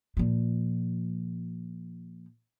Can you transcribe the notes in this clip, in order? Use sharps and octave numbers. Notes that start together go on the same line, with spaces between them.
A#2 F3